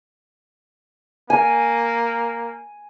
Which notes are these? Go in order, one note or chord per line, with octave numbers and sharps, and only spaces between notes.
A#3 G#5